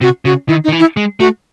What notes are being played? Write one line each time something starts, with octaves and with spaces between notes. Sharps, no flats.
C3 F#4
C#3 F#4
D#3 E4
D#4
D#3
E3
E4
G#3
A3 F#4